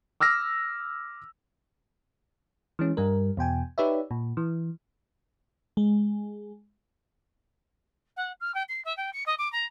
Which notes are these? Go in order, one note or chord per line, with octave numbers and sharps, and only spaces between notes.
D6 E6 F6 A#6
E3 G#3 C#4
G2 G3 A#4
E2 B2 G5 G#5
D#4 G4 B4 C#5 D5 E5
A#2
E3
G#3
F#5
F6
G5
C7
E5
G5
C#7
D#5
D6
A#5